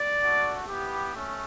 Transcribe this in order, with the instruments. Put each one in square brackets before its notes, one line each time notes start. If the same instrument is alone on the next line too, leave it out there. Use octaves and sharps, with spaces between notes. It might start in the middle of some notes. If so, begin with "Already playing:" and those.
Already playing: [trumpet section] D5
A3 D4 F#4
B3 E4 G4
A3 C#4